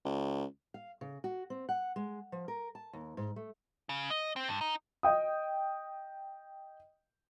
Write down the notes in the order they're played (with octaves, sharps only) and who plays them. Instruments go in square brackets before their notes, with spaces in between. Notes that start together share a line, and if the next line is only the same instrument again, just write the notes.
[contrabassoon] C#2
[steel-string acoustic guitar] F5
C#3
F#4
C4
F#5
G#3
F3
A#4
A5
D#2
G#2
A3
[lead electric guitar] C#3
D#5
C4
G2
D#4
[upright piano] D#5 G5 D#6